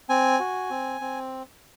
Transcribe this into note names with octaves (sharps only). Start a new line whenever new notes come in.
C4 G#5
F#4
C4
C4